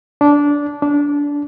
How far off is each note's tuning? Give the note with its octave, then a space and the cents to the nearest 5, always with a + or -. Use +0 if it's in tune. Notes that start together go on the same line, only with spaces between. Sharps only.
D4 -15
D4 -20